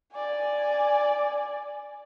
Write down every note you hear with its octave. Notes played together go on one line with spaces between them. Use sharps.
D5 G#5